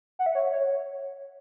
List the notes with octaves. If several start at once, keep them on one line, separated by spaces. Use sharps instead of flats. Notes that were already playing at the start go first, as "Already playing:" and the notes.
F#5
E5
C#5
C#5